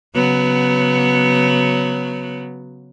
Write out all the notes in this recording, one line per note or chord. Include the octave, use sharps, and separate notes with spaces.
C#3 F#3 B3